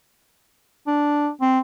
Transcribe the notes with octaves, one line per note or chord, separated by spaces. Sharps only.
D4
C4